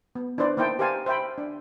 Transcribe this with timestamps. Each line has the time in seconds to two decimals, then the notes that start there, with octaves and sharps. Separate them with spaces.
0.15 B3
0.38 D4 E4 B4 C5 D5
0.57 A#3 D#4 E4 C5 G5 A5
0.79 G4 A#4 C5 F5 G#5 A5
1.06 C5 E5 G5 B5
1.38 D4